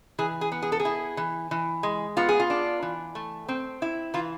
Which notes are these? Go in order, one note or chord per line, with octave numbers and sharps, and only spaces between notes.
E3 G#4
G#4
B3
G#4
A4
G#4
E4
E3
E3
G#3
B3 F4
G#4
F4
D4
E3
A3
C4
E4
E3 F4